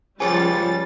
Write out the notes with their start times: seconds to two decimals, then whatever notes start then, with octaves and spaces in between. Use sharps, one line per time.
0.20 C#2 F3 G3 C5 C#5 G5 G#5 A6